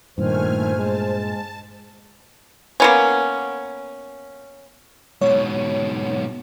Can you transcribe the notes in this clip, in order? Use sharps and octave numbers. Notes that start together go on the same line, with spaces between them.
G2 A#2 D#3 A3 C5 G#5 F6
G#3 A5
A#3 B3 C#4
G#2 B2 C#5